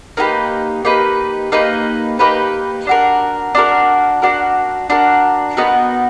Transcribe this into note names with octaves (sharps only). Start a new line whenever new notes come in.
A#3 D#4 G4 B4
A#3 D#4 G4 B4
A#3 D#4 G4 B4
A#3 D#4 G4 B4
D4 F#4 A#4
D4 F#4 A#4
D4 F#4 A#4
D4 F#4 A#4
B3 D#4 F#4 A#4